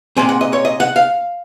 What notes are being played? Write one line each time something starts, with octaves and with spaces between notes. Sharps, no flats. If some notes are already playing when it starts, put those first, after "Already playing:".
A#2 G#3 C4 G#5
F#5
D#5
C#5
D#5
F#5
F5